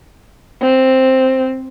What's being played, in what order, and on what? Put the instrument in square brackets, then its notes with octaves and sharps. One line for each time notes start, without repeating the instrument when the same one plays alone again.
[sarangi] C4